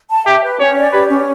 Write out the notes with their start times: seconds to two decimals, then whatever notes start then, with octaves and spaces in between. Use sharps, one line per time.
0.10 A5
0.26 G4 E5
0.43 B4
0.60 C#4 C#5
0.76 D5
0.92 G4 B4
1.09 C#4